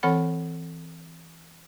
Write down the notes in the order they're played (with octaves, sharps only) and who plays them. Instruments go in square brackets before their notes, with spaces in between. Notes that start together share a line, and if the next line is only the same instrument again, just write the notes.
[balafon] E3 C4 A4 C#5 F#5 B5